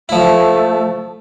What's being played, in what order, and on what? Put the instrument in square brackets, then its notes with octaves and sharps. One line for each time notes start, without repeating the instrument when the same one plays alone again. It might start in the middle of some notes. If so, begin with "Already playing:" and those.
[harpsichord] F3 E4 [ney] A3